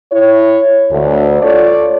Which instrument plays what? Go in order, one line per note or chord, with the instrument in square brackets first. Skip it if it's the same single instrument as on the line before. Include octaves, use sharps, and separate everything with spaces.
[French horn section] E4 C#5
D2
F4 A4 C#5 D5